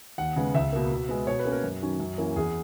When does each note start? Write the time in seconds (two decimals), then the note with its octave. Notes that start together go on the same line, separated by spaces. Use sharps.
0.18 D#2 F#5
0.36 C#3 G#3 B3
0.55 C#2 E5
0.73 B2 A#3
0.91 B2
1.09 G#3 B3
1.27 B2 C#5
1.39 B4
1.45 A#3 C#4
1.52 A#4
1.64 F#2
1.82 D#3 F#3 C#4
2.00 F#2
2.18 E3 A#3 C#4
2.36 E2 G#4